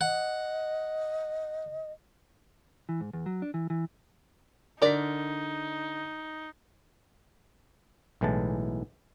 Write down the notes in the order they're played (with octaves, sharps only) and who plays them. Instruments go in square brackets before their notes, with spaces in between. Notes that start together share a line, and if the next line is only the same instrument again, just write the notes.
[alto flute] D#5 [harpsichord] F#5
[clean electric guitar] E3
G#2
E2
F#3
D4
E3
E3
[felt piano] D3 B6 [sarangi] D#4 [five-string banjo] A#4 D5
[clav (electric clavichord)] B1 A2 E3 G#3 A5